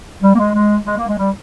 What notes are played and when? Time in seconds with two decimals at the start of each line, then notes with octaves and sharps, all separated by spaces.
0.22 G3
0.35 A#3
0.39 G#3
0.55 G#3
0.86 G#3
0.98 A#3
1.08 G#3
1.19 G3